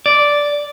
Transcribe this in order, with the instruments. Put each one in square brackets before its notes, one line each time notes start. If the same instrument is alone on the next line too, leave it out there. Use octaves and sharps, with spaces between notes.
[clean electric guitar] D5